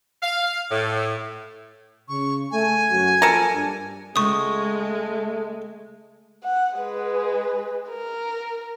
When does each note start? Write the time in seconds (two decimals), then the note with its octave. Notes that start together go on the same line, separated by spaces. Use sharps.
0.22 F5
0.71 A2
2.09 C#3 C#6
2.51 A3 G#5
2.90 F#2 F#3 F#4
3.22 F3 A#3 A4 A#4
3.53 G2 G3 D4
4.16 C#2 G#3 A3 C#6 D#6
6.44 F#5
6.77 G#3 B4
7.89 A#4